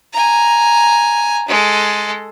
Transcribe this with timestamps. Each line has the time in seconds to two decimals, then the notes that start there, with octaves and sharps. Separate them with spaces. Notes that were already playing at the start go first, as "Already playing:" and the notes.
0.13 G#5 A#5
1.48 G#3 A4